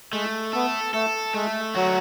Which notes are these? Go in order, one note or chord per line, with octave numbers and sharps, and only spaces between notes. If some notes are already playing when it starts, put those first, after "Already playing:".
G#3 A3
B3 A4
A3 A4
G#3 A3
F#3 F#4